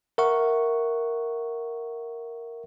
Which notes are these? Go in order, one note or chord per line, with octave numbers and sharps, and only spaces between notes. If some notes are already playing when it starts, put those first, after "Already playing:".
A#4 E5 F#5 C#6